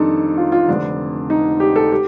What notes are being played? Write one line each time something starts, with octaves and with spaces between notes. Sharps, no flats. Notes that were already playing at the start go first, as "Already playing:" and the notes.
Already playing: F2 D#3 G3 D4 D#4 A4
F4
F4
F1 F2 D3 D4
D#4
G4
A4
G4